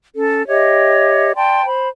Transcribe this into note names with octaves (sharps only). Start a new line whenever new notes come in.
C#4 A4
G4 C#5 D#5 E5
D5 G5 A5 C6
C5 B5